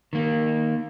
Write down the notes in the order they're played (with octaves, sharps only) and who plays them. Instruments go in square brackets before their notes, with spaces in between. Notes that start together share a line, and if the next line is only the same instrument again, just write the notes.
[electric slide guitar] D#3 A#3